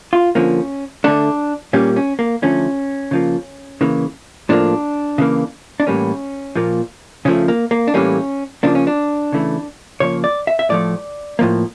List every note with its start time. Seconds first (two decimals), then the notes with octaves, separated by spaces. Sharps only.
0.13 F4
0.35 D3 F3 A#3 C#4
1.04 D3 A3 D4
1.73 A#2 G3 A#3 C#4
1.96 C#4
2.19 A#3
2.42 D3 F3 A3 C#4
3.11 C#3 F3 A#3
3.81 C#3 E3 A#3
4.49 A2 F3 A#3 D4
5.18 C#3 E3 A#3
5.80 D4
5.87 A2 E3 G3 A#3 C#4
6.56 A#2 F3 A#3
7.25 C#3 F3 A3 C#4
7.48 A#3
7.71 A#3
7.88 D4
7.94 A2 E3 G3 A#3 C#4
8.63 C#3 F3 A#3 D4
8.75 C#4
8.87 D4
9.32 C#3 E3 A3
10.00 C#3 F3 A#3 C#5
10.24 D5
10.47 E5
10.59 E5
10.69 A2 F3 A3 D5
11.39 A2 F3 A#3